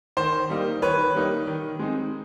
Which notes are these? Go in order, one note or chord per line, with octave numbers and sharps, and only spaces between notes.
D#3 C5
G3 A#3 D#4
D#3 B4 C#5
G3 A#3 D#4
D#3
G#3 C4 D#4